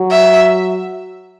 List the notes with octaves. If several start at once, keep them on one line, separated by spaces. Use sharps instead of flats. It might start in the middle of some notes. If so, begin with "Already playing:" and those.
Already playing: F#3
E5